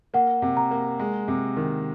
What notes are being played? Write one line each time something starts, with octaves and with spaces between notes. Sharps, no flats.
A#3 F#5
C3
A#5
A#3
G#3
C3
D#3